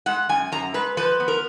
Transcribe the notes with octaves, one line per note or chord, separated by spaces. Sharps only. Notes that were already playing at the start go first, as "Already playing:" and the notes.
G#3 F#5
F#2 G#5
F#2 A#5
G#3 B4
F3 B4
B3
A#4